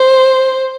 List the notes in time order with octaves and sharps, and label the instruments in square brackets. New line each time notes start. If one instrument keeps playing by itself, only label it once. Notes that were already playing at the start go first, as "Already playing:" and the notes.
Already playing: [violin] C5